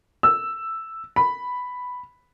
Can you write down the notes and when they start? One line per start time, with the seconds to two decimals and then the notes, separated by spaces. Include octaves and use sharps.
0.23 E6
1.16 B5